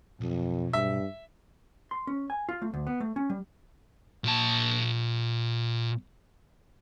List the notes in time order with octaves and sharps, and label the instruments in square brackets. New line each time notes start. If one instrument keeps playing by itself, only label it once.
[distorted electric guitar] B1 [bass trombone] F2
[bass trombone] G2 [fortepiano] E5
[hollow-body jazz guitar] C6
C#4
G#5
F4
A3
D2
B3
A3
C#4
G3
[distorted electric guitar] A#2 A5